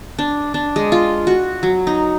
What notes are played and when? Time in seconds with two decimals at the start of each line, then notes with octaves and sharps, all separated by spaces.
0.19 D4
0.54 D4
0.76 G#3
0.92 F4
1.27 F#4
1.63 F#3
1.87 D#4